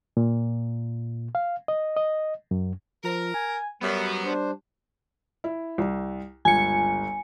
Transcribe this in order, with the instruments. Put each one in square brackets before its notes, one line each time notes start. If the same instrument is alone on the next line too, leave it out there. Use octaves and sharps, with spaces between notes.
[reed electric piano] A#2
F5
D#5
D#5
F#2
[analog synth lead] F3 [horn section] A#4
[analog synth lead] G#5
[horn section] F#2 [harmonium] F#3 [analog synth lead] G3 [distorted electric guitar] B3
[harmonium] D4 C5
[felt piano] E4
C2
[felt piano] G1 C#2 [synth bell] G#5 C#7